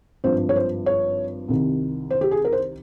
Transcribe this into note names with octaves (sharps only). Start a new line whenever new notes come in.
G#1 G2 F3 C5
C#5
C5
C#5
C2 C3 D#3
C5
G4
G#4
A#4
C5